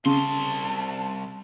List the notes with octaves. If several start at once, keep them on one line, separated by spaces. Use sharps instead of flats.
C2 C#3 A5 C6